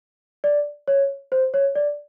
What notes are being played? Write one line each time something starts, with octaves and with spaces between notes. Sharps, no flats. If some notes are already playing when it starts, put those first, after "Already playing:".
D5
C#5
C5
C#5
D5